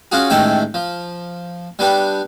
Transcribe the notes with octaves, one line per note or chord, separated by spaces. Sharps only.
C#4 F4 F#4 G#4
A1 D#3 G#3 A3 E5 G5
F3
G3 B3 D4 G4